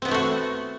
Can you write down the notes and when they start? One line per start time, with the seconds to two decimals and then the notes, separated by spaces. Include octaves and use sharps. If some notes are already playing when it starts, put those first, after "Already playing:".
0.02 C4
0.05 B3
0.08 E4
0.11 A3
0.14 F#4